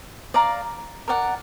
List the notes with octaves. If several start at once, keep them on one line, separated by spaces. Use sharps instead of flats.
D5 F5 A#5
A#4 D5 F#5